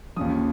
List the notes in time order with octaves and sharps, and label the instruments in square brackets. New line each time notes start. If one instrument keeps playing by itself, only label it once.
[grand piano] D#2 C#3 F3 D#6